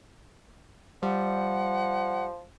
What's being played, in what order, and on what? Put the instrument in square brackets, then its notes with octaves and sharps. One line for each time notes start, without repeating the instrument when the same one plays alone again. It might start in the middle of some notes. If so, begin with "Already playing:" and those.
[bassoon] F3 [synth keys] G3 [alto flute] F#5